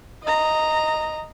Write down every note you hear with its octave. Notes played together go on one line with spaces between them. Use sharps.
D#5 A#5